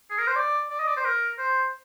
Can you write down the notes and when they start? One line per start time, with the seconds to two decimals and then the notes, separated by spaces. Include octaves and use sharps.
0.10 G#4
0.19 A#4
0.27 C5
0.36 D5
0.70 D5
0.80 D#5
0.88 D5
0.97 C5
1.05 A#4
1.39 C5